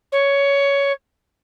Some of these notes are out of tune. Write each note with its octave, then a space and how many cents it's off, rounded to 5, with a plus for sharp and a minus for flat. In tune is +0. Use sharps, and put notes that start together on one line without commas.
C#5 +10